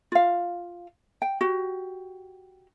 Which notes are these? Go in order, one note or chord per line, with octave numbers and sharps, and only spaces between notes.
F4 F5
G5
F#4 G4